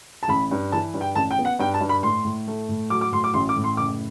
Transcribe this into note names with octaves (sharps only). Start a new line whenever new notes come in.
A5
A1 B5
G2
E3 A5
G2
G5
A1 A5
G5
B3
F#5
G2 G5
A5
G2
B5
A2 C6
A2
A3
A2
F#3 D6
D6
A2 C6
D6
A1 C6
D6
A2
C6
F#1 D6